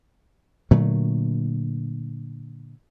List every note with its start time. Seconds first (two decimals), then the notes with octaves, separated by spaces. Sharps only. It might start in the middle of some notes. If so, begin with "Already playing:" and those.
0.71 A#2 D3 F#3 A3